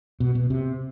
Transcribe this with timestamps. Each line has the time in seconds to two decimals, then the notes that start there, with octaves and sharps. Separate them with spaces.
0.20 B2
0.35 B2
0.50 C3